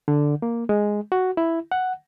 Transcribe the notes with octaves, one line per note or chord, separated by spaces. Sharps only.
D3
A#3
G#3
F#4
E4
F#5